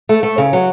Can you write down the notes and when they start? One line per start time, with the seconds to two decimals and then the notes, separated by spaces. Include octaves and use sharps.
0.09 A3
0.23 A3
0.38 C#3
0.53 F#3